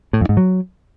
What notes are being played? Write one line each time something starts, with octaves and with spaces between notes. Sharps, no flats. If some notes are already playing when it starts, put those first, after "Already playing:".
A2
F2
G#2
F#3